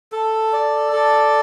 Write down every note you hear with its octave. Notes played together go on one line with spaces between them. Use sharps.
A4
D5
A4